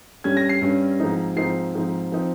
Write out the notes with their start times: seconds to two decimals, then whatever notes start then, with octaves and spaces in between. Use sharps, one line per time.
0.24 G2 G3 C#4 G#6
0.37 A#6
0.49 C7
0.62 G2 G3 C#4
1.00 G#2 F3 C4 D#4
1.37 G#2 F3 C4 D#4 C7
1.75 G#2 F3 C4 D#4
2.12 F3 C4 D#4